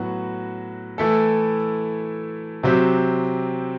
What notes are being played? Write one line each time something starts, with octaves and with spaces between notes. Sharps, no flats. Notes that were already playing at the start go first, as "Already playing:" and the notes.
Already playing: A2 F#3 B3 F#4
E3 A3 E4 A4
C3 F#3 C4 G4